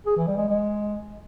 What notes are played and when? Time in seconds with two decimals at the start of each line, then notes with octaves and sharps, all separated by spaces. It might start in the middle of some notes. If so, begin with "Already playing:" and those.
0.07 G#4
0.17 E3
0.27 G3
0.38 G#3
0.48 G#3